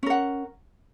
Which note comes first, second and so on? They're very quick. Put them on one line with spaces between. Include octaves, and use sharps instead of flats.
C#4 A#4 F#5